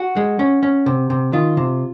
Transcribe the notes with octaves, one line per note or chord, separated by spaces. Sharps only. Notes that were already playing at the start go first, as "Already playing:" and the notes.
Already playing: F#4
G#3
C#4
C#4
C3
C3
D#3 F4
C3